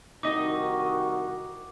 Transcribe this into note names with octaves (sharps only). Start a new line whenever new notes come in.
C2 D#3 D#4 F#4 D#5 D6